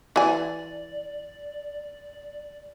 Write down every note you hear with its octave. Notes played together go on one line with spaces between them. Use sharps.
E3 D5 G#5